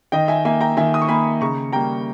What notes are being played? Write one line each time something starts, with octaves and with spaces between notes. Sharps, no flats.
D#3 D#5 G5
E5 G#5
A#3 E5 G#5
G5 A#5
D#3 E5 G#5
D#6
C#6
A#3 G#5 B5
C#3 A#5 C#6
G3 A#3 G5 A#5